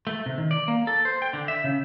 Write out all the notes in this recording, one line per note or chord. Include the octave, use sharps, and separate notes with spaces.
A3
C3
D#3
D5
A#3
A4
C5
G5
D3
E5
C#3